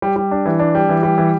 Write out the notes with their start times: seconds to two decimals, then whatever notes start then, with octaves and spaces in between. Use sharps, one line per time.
0.02 G3
0.16 G3
0.31 D4
0.46 E3
0.59 D4
0.75 G3
0.89 E3
1.03 G3
1.18 E3